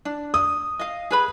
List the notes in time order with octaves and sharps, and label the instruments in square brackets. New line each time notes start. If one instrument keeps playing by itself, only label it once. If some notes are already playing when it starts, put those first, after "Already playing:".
[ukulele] D4
[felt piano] D#6
[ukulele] D#5 F5
G#4 B4 B5